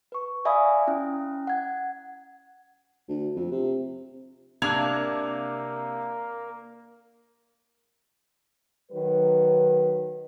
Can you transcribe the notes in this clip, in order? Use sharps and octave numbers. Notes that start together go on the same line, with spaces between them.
B4 C#6
D5 E5 F5 G#5 B5 D#6
C#4 E4 G5
F#5 G#6
D2
F2
C3
C3 A#3 D4 G#6 F7
D#3 F#3 B4